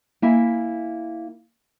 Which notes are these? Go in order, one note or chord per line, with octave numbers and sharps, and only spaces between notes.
A#3 E4 E5 G#5